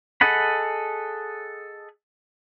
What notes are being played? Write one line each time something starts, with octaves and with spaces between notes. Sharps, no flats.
G#4 A4 D#5 F#5 B5